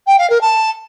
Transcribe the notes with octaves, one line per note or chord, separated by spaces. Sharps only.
G5
F5
A#4
A5